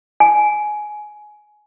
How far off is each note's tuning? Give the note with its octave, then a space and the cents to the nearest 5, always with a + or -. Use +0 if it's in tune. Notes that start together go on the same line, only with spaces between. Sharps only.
G#5 +15